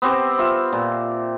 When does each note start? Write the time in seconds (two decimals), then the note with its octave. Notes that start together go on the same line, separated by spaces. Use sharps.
0.02 B3 C4 G4 C5
0.39 F4 E5
0.72 A#2